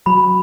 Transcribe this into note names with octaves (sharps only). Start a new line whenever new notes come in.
F#3 B5